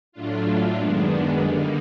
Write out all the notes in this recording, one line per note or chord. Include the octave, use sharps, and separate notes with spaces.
A2 F#3 A3 D4 F4
F#2 D#3 G#3 B3 D4
D3 G3 A#3 D#4